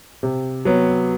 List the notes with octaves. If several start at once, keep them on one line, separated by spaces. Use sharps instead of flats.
C3
F#3 B3